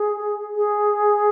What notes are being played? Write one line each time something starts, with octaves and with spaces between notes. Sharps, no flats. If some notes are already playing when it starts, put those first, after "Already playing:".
Already playing: G#4
G#4